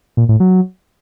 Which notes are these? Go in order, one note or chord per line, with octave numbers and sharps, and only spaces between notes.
A#2
A2
F#3